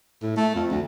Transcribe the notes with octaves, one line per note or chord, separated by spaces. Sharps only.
A2
A3
F2
D2